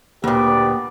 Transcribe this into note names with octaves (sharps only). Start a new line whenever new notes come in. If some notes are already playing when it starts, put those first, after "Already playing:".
D2 A#2 A#3 B3 G4 D5